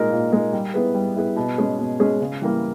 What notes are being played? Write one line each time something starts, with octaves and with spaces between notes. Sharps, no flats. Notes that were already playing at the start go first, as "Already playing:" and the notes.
Already playing: A#2 G#3 D#4 A#4
A#2
G#3 D#4 A#4
G3
B3 E4 G#4 B4
G3
B3 E4 G#4 B4
B2
G#3 C#4 G#4
B2
G#3 C#4 G#4
C#3
E3 G3 A#3